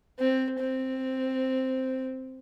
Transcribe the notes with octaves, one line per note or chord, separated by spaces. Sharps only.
C4
C4